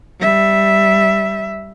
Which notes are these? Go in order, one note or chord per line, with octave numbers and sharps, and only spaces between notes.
G3 E5